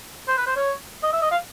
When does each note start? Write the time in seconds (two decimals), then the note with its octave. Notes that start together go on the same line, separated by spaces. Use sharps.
0.28 C5
0.37 B4
0.46 C5
0.56 C#5
1.03 D#5
1.13 E5
1.22 D#5
1.31 F5